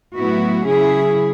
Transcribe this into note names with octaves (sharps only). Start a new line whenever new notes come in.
A2 F#3 B3 E4 F#4
C#3 F#3 C#4 E4 G#4